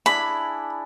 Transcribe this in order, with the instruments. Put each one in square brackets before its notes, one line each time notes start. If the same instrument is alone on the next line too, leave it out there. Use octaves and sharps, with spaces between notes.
[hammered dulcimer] D4 E4 G#4 [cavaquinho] B5